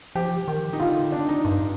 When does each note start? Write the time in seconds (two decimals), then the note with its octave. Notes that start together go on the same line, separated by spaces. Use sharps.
0.15 F3 G4
0.48 D#3
0.73 D#4
0.80 D3 F4
1.12 D4
1.29 D#4
1.45 G2